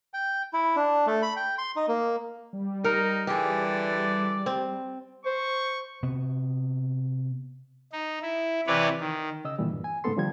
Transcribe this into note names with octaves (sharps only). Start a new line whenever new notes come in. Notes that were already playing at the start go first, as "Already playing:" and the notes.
G5
E4
D4
A3
B5
G5
C6
D#4
A#3
G3
D#4 A#4
D3 E3 G4 G#4
D5
C4
C5 C#6
C3 B3
D#4
E4
C3 E3 B4 C#5 D5
D#3
C#3 D#5 E6
A#2 D3 E3 G3
G2
G#5
G#2 C#3 A3 B3 A4 C6
D3 F3 G3 G#6